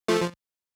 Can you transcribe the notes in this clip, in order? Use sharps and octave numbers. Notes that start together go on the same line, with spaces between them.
F3 A3
F3